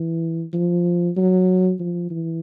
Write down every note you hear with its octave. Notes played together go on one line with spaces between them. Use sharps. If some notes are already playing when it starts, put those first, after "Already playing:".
Already playing: E3
F3
F#3
F3
E3